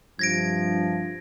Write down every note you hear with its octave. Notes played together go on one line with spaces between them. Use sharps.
G2 C3 F3 G#6 A#6 D7